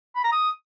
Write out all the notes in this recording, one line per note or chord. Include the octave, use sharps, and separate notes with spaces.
B5
A#5
D#6